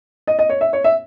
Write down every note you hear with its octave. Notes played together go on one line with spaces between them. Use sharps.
D#5
D#5
C#5
E5
C#5
E5